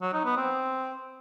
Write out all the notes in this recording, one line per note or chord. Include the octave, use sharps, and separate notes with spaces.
F#3
D#4
B3
C4